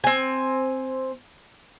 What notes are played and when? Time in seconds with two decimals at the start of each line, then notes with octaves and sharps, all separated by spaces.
0.04 C4 G#5